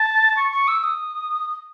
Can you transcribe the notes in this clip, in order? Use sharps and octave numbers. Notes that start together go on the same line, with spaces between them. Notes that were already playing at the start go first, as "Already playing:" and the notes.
Already playing: A5
C#6
C#6
E6
D#6